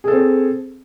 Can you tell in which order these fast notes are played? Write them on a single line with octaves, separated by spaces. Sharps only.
G#4 A4 C4